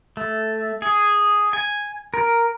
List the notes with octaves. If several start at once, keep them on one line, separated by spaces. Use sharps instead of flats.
A3
G#4
G#5
A#4